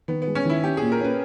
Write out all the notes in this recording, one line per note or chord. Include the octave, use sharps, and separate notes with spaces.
D#3 B3
B3
G#3
C#4
D#3 E4
C#4 G4
A#2 G#4
A#4
C#4 B4